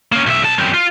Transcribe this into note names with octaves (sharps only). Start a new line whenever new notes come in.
A#3 C#4
B1 E5
B1 A5
F#2 C4
F4